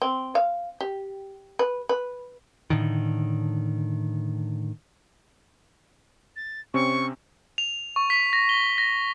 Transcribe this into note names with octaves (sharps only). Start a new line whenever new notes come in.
C4
F5
G4
B4
B4
A2 D3 D#3
A6
C3 C4 C#4 C#6
F7
C#6
B6
A#6
G7
A#6